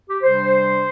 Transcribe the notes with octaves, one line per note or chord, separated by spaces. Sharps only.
G4
C3 G3 D4 C5